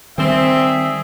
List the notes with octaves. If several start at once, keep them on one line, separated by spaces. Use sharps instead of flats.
D#3 G3 C4 G#4 E5